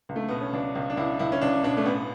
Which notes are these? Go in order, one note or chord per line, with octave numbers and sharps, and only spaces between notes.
C#2
A3
B2 B3
C#4
C#2 D4
C#2
D4
C#2 E4
C#2 E4
C#4
C#2 D4
B2 D4
A3
A1 B3